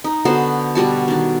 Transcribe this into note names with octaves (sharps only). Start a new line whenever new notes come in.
D#4
D3 B3 F#4 C5
B2 G3 F#4 A5
D#3 D4